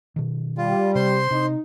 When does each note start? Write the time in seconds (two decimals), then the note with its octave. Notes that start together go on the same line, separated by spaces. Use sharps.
0.16 B2 D#3
0.58 G3 F4
0.95 C3 C5 C6
1.31 C3 D#4